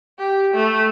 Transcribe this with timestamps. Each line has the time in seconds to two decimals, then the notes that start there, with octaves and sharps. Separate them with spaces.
0.19 G4
0.54 A3